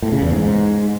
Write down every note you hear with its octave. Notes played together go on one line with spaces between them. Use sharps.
A2
C#3
E2
G#2